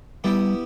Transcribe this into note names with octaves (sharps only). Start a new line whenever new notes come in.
G3 B3 E4 G4